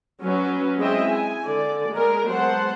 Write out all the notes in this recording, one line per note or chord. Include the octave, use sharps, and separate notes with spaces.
F#3 C#4 B4
G#3 C4 E4 D#5 E5 G5
G#5
D3 D5
G#3 B3 A#4
F#3 G#3 B3 C5 F#5 A5